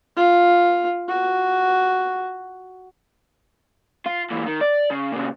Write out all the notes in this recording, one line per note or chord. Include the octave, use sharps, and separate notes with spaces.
F4
F#4
F4
A#2 E3
D#3
D5
C#3
A#2 C#3